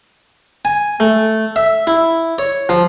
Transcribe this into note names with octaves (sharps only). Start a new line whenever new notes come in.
G#5
A3
E5
E4
C#5
F3